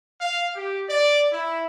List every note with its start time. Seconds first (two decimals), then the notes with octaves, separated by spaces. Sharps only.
0.21 F5
0.55 G4
0.88 D5
1.31 E4